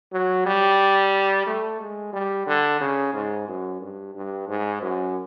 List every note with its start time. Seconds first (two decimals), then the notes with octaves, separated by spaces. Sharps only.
0.13 F#3
0.46 G3
1.47 A3
1.80 G#3
2.13 G3
2.47 D3
2.81 C#3
3.14 G#2
3.48 F#2
3.81 G2
4.15 G2
4.48 G#2
4.82 F#2